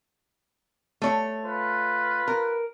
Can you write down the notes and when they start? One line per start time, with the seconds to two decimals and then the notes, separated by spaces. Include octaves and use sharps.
1.02 A3 C#5
1.43 F4 B4
2.28 A#4